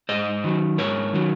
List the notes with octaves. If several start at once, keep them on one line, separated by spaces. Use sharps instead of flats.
G#2 C5 D#5
D#3 F#3
G#2 A#4 C#5
D#3 F#3